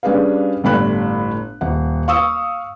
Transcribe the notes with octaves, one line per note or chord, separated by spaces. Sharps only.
G3 C#4 D4 G#4 B4 F5
G1 A2 G3 B5 F#6
D#1 F#5
F5 C#6 D#6 E6